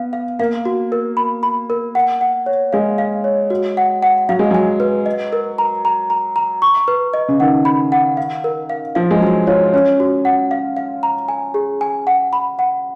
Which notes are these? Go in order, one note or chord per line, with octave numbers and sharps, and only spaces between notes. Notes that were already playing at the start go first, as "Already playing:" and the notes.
Already playing: B3 F5
F5
A#3 F5
F#4
A#4
B5
B5
A#4
F#5
F#5
C#5
G#3 F5
F5
C#5
F#4
F#5
F#5
F#3 F5
G#3
F#3 G#5
B4
D#5
A#4
A#5
A#5
A#5
A#5
C#6
B4
D#5
C#3
D#3 F#5
B5
F#5
F5
A#4
F5
F3 F5
G#3
F#3 F#4
F4 C#5
C#4 C#5
F#4
F#5
F5
F5
A#5
G#5
G#4
G#5
F#5
B5
F#5